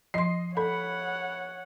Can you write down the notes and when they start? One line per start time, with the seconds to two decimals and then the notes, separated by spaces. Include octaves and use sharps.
0.14 F3 D#5 C6 C7
0.57 A4 C#5 F#5 B5